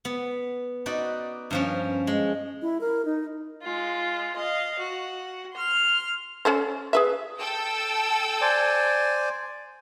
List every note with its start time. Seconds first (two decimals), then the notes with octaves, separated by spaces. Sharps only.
0.05 B3
0.86 D#4 F#4 B4 D5
1.51 G2 F3 C#4
2.07 G#3
2.62 E4
2.81 A#4
3.05 D#4
3.62 G#3 F4
4.36 D#5 F5
4.79 F#4
5.53 C6 F6
6.45 C#4 A4 C5
6.93 G#4 B4 E5
7.39 A4 G5 E6
8.41 C5 D5 G#5